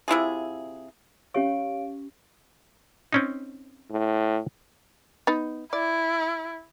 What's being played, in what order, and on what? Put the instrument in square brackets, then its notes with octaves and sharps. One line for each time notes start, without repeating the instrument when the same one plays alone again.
[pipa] C3 E4 F4 G#4
[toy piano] C#4 G4 C#6 [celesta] C#5 F5 D7
[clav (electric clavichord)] C4 C#4 D#4
[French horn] A2
[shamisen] B3 D#4
[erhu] E4 [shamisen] D5